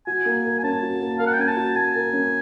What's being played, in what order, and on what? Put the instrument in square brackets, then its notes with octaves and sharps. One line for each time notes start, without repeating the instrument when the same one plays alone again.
[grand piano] F#4 [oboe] G#5
[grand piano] A#3
A#4
[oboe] G#5
[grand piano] C#4 [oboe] A5
[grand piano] F#4
A#3
[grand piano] A#4 [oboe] F5
[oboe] F#5
G5
[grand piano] C#4 [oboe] G#5
[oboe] A5
[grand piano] F#4
[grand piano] A#3 [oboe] G#5
[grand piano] A#4
C#4